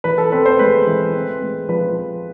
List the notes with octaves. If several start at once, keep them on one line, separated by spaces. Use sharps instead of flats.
E3 B4
A4
C4 B4
C5
G#3 B4
E3
C4
G#3
F3 B4